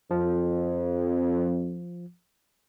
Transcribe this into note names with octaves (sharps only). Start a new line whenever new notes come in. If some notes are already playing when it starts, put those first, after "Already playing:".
F2 F3